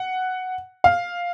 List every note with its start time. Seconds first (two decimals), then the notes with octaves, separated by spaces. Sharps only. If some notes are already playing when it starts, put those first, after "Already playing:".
Already playing: F#5
0.84 F5